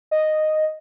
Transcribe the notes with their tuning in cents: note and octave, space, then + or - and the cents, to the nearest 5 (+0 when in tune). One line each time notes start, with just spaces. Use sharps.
D#5 -5